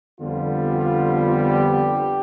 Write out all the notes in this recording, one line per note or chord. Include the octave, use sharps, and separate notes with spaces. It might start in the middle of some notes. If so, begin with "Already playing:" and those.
F2 D3 G3 B3 F4
F4
G4